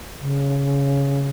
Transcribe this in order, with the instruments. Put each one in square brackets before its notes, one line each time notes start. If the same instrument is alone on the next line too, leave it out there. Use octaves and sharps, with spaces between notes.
[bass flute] C#3